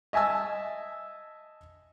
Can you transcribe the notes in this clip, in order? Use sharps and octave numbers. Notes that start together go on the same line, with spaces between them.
D#5 E5 G#5 A5 E6